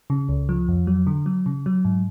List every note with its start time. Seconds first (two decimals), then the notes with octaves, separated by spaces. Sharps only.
0.10 C#3
0.29 C#2
0.49 F3
0.69 F2
0.87 F#3
1.07 D3
1.26 F#3
1.46 C#3
1.66 F#3
1.85 G#2